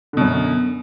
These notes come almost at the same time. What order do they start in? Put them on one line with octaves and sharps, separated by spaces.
D3 B2 F#2